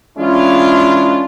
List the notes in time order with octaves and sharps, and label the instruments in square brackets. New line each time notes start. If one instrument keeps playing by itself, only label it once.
[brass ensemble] E3 G#3 C#4 D4 E4 F4